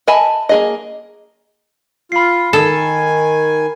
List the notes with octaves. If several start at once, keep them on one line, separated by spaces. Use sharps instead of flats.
D#5 E5 G#5 A5 B5
A#3 G#4 D#5
F4 B5 C7
D#3 A4 G#5